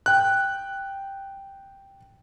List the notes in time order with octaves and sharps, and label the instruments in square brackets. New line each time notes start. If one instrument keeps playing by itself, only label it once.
[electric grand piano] G5 F#6